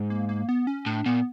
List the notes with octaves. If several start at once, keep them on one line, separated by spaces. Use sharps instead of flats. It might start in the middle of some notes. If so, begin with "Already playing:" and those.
Already playing: G#2
A#3
A#3
B3
C#4
A2 D4
A#2 B3